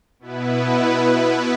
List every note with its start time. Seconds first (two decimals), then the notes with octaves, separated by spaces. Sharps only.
0.19 B2 B3 E4 B4